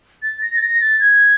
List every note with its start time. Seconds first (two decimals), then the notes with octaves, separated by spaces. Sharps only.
0.22 A6
0.41 A#6
0.56 A6
0.62 A#6
0.81 A6
1.00 G#6